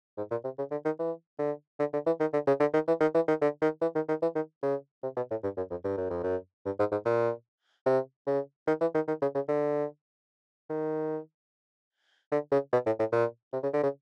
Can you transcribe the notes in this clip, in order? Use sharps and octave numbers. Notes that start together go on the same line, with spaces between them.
G#2
A#2
C3
C#3
D3
D#3
E3
D3
D3
D3
E3
D#3
D3
C#3
D3
D#3
E3
D#3
E3
D#3
D3
D#3
E3
D#3
D#3
E3
D#3
C#3
C3
B2
A2
G2
F#2
F2
G2
F#2
F2
F#2
G2
G#2
G#2
A#2
C3
C#3
D#3
E3
D#3
D#3
C#3
C#3
D3
D#3
D3
C#3
B2
A2
A2
A#2
C3
C#3
D3
C#3